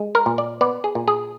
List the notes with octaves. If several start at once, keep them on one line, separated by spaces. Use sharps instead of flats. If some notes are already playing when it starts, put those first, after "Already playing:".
Already playing: G#3
A#4
A#2
D5
B3 D5
G#4
A#2
G#4